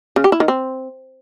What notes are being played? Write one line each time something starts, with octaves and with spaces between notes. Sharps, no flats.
C#3
G4
E4
D#3
C4